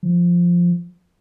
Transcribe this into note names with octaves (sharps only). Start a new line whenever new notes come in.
F3